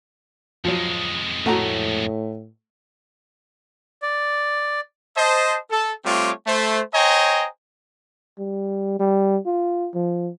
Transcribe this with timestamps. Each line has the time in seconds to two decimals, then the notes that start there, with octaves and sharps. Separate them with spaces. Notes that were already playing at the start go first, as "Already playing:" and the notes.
0.65 F2 F3 F#3 G#3
1.46 A2 A3 F#4 A#5
4.02 D5
5.16 C5 D#5 A5
5.71 A4
6.05 G3 A3 C4 F4 C#5 D6
6.47 A3 C5
6.94 C5 C#5 D#5 G5 G#5 A#5
8.39 G3
9.00 G3
9.46 F4
9.94 F3